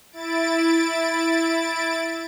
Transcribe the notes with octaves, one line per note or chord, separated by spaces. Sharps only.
E4 A6 D7